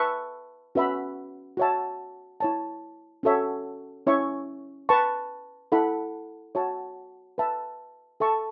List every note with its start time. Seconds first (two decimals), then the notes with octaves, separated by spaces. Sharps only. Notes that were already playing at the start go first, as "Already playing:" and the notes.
Already playing: B4 E5 A5 C#6
0.75 C#4 F#4 B4 E5 B5
1.57 F#4 C#5 E5 A5
2.40 E4 C#5 A5
3.23 C#4 F#4 A4 C#5 E5
4.07 C#4 E4 C#5 E5 C#6
4.89 B4 A5 C#6
5.72 E4 A4 F#5 B5
6.55 F#4 C#5 E5 A5
7.38 B4 E5 A5
8.20 A4 E5 A5 C#6